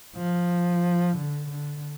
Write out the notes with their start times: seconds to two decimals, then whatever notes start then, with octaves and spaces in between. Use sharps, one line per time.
0.16 F3
1.17 D3
1.50 D3